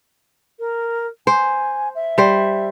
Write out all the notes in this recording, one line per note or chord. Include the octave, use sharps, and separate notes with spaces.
A#4
C5 G#5
E5
G3 C5